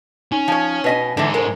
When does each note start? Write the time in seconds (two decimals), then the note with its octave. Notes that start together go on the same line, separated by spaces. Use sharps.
0.32 C#4 D#4
0.48 F3 C#5
0.84 B2 B4 D#5 G#5 B6
1.17 G#2 D3 E3 A4
1.34 G#3 A#4 C5